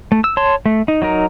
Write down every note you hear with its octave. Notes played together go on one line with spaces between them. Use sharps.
A3
E6
C#5 A5 C6
A3
D#4
F#3 D#4 A#4